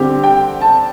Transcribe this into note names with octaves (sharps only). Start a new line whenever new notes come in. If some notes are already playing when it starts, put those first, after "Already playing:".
Already playing: D3 G3 C4 G4
G5
A5